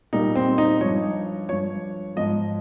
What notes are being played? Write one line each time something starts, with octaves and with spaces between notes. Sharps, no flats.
A#2 G3 D#4
C4
D#4
G2 F3 C#5
G2 F3 C#5
G#2 F3 D#5